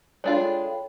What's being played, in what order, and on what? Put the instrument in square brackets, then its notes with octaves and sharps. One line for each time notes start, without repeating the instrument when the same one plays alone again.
[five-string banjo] G#3 D4 F4 [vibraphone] A4 G5 B5 [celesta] C#5